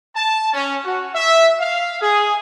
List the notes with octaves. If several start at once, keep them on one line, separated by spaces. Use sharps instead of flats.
A5
C#4
F#4
E5
F5
G#4